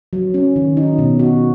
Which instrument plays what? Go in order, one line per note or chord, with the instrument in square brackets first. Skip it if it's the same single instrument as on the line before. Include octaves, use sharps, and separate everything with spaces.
[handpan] F#3
C#4
D#3
D#4
B2
F#4